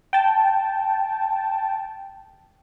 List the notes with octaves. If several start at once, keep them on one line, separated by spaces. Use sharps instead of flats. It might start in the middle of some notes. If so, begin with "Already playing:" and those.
G5 A5